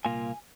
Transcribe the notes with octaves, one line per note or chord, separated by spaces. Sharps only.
C2 A#2 A#3 F4 G#5